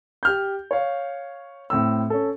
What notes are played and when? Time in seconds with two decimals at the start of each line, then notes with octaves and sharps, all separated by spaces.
0.23 G4 F6 G6
0.71 C#5 F5
1.70 A2 C4 E6
2.10 C#4 A4